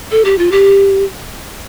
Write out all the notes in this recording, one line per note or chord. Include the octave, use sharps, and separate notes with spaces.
A4
G4
F4
G4